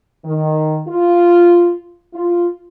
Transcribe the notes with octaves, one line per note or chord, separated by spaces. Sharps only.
D#3
F4
F4